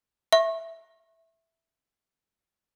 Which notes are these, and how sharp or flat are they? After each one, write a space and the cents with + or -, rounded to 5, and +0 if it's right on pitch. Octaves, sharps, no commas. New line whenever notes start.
E5 +0 C#6 -30